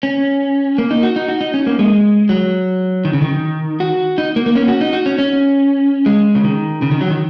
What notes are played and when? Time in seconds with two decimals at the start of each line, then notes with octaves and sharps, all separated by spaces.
0.03 C#4
0.78 A#3
0.91 D#4
1.03 F#4
1.16 D#4
1.28 F#4
1.41 D#4
1.54 C#4
1.67 A#3
1.79 G#3
2.29 F#3
3.05 D#3
3.13 C#3
3.22 D#3
3.80 F#4
4.18 D#4
4.36 A#3
4.46 A#3
4.55 C#4
4.68 F#4
4.81 D#4
4.93 F#4
5.06 C#4
5.19 C#4
6.06 G#3
6.35 C#3
6.44 D#3
6.82 C#3
6.91 D#3
7.01 F#3
7.10 D#3